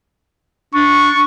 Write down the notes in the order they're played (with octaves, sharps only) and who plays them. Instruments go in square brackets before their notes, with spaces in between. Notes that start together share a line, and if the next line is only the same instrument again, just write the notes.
[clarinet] D4 [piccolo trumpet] C#6